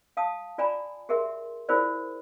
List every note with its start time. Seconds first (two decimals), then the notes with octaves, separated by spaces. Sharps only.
0.17 F5 A5 D#6
0.58 F4 D5 G#5 A#5 B5
1.09 G4 G#4 A#4 E5 C6
1.69 E4 F4 G#4 A#4 C5 D5